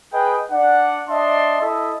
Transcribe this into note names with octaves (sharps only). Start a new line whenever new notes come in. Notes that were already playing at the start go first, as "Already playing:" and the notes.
G#4 B4 D#5 G5
D4 D5 F#5
D4 D#5 E5 A5 C6
E4 A4 D#5 E5